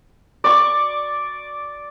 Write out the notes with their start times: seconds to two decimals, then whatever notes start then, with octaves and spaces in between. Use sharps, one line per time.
0.44 D5 C#6